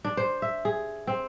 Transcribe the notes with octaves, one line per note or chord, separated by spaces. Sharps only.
D4
C5
E5
G#4
C4